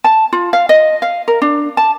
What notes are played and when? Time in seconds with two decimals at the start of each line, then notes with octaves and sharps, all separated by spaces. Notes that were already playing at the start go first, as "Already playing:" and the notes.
0.04 A5
0.33 F4
0.53 F5
0.69 D#5
1.02 F5
1.28 A#4
1.42 D4
1.77 A5